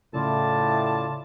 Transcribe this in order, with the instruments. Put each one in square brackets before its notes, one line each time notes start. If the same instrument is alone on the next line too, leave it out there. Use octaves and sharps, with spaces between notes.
[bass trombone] A2 [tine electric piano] C#3 [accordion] E4 F4 D5 [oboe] A5